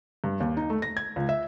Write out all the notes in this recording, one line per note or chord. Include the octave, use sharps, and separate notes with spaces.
G2
D#2
D#4
A3
A#6
G#6
C#2
E5